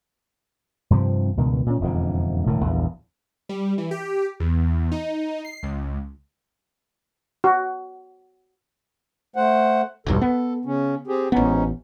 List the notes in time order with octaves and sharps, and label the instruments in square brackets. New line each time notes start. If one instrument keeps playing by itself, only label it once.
[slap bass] G2 C3 F3 C4
C#2 G2 B2 D#3
A#2 C#4
E1 F2 G#2 D3
E1 A2 D3 D#3
A#1 E2 G2
[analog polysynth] G3
E3
G4
E2
D#4
C7
C#2
[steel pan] F#4
[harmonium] A3 C5 F#5
[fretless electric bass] E1 B1 G2 [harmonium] A4
[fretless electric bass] B3
[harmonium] C#3 C#4
C4 G4 G#4
[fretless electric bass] A1 B3 [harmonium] G#2 C#4 D#4